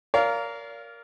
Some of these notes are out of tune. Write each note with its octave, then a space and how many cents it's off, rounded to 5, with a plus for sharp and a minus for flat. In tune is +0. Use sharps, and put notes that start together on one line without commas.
A#4 +0 D5 -40 F5 -10